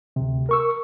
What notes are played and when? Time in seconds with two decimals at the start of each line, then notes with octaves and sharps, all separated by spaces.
0.16 D2 C3
0.49 A#4 C#6 E6